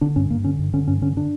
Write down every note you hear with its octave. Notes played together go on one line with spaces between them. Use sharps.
D3 D4
G2 C#4
G2 A#3
D3 C#4
G2
D3 C#4
G2 C#4
D3 C#4
D3 D4